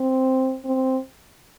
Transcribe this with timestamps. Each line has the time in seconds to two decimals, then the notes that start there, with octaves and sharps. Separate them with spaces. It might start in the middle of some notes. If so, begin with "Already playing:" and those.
Already playing: C4
0.65 C4